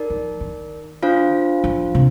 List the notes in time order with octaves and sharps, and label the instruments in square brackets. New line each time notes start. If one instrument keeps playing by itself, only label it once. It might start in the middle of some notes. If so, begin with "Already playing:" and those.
Already playing: [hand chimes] D#4 A#4 D5
[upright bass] F3
D#3
[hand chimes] D4 F4 C5 F5
[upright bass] F3
C3